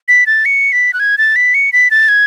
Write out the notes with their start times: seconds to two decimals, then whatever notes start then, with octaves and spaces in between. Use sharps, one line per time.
0.08 B6
0.27 A6
0.45 C#7
0.72 B6
0.93 F#6
1.00 G#6
1.18 A6
1.36 B6
1.54 C#7
1.73 B6
1.91 A6
2.08 G#6